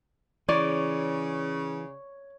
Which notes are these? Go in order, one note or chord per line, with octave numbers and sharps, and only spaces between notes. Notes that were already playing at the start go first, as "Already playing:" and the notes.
C#3 E3 C#5 D5